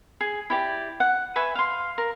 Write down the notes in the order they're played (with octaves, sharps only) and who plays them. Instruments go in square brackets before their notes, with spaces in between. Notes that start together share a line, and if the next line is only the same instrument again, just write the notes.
[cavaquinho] G#4
E4 G4 D5
F#5
B4 E5 G#5 C#6
F5 C6
A#4